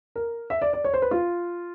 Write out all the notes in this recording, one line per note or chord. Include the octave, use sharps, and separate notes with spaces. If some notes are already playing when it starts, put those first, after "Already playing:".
A#4
E5
D5
D5
C#5
C5
B4
F4